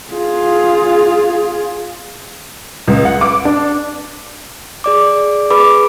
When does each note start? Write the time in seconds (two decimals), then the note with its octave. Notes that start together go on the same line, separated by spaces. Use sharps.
0.11 F4 G#4
2.88 C#2
3.05 F#5
3.21 D6
3.45 D4
4.84 G#4 D5 D6
5.50 G#4 B4 B5 D6